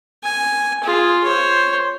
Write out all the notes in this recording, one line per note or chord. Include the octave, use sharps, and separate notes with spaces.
G#5
F4 G#4
C5 C#5